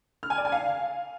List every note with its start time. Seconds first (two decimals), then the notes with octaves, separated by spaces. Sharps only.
0.23 F6
0.30 G#5
0.38 D5
0.45 G#5
0.52 F5